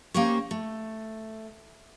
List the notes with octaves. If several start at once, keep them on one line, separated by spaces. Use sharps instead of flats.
A#3 C#4 G4 C5 C#5
A3